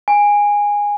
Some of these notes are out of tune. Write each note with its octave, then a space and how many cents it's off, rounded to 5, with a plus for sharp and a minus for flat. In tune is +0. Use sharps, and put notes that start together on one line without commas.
G#5 -15